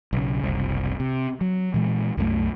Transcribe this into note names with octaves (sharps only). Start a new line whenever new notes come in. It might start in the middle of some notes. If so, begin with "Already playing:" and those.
B1 C#3
F#1 C2
C3
F#3
A#2 E3 G#3
C2 F#2 G#3 A3